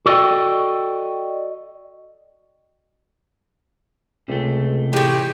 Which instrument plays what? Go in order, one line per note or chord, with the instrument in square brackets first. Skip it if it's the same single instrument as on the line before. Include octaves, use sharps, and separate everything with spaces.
[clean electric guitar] F#4 A4 D5 D#5 G5
[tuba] C#2 [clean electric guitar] C3 A3
[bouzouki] A2 G#3 [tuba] E3 [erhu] G4